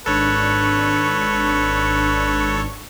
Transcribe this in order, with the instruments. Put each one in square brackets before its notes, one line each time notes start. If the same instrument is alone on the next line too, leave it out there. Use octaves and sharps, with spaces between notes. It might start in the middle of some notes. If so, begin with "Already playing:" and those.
[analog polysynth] G#1 D4 C#6 [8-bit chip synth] A4 C#5 [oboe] B4